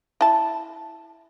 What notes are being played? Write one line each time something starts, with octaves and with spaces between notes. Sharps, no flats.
E4 A5